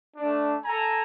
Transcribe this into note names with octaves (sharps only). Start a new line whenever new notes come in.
A3 D4
A4 G#5 A#5